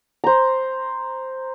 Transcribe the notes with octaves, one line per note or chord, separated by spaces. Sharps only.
C5 A#5